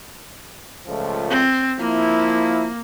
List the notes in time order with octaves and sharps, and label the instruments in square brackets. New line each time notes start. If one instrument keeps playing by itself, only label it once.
[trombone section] C#2 F3 A3
[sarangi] C4
[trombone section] F3 E4 [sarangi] A#3